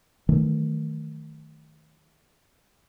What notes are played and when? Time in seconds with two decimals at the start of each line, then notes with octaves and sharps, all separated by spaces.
0.29 D#3 E3 F#3 A3